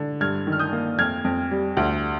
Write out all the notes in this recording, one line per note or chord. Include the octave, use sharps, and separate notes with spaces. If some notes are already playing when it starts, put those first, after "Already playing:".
Already playing: D3
G2 F6 G#6
D#3
F6
D#6 G6
A#3
F2 F6 G#6
F2
G3
D2